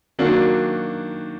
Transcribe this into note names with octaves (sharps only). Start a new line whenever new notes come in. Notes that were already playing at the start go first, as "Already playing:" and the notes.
D#3 F#3 A#3 D4 F#4